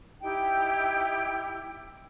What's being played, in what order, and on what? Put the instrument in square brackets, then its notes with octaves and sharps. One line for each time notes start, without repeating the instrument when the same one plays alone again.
[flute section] D#4 E4 G4 G5